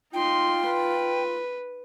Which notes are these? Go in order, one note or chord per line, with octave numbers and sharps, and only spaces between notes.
D#4 F4 G5 C6
B4